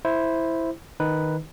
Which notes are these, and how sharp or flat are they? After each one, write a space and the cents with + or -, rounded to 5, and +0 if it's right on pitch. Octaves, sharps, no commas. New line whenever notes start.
E4 +0 C5 +0
D#3 +0 D#4 +0 B4 +0